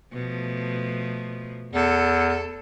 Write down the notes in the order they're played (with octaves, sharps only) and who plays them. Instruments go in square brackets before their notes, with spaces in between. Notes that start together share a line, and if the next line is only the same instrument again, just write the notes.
[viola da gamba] B2 F3 A3
[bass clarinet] E2 [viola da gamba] A4